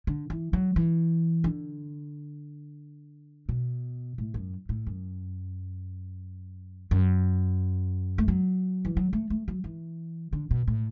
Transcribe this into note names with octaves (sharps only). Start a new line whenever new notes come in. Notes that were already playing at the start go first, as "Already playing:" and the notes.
D3
E3
F#3
E3
D3
B2
A2
F#2
A2
F#2
F#2
A3
F#3
E3
F#3
A3
A3
F#3
E3
D3
B2
A2